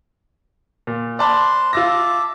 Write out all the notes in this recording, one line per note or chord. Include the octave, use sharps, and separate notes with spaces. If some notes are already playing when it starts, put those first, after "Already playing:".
A#2
C5 D5 A5 B5 C6 F#6
F4 E5 A5 D6 E6 A#6